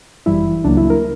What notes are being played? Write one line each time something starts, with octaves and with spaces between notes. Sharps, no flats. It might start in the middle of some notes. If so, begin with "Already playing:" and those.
G1 F#2 E3 G3 E4
C#2 C#3 F#3 A#3 D4
E4
A#4